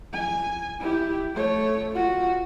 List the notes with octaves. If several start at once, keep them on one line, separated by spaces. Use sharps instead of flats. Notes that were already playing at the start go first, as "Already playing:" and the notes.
G#5
E4 G4
A3 C#5
F4 F#4